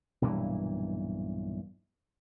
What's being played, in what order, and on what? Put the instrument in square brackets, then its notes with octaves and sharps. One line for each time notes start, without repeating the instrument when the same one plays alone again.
[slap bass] B1 G2 A#2 E3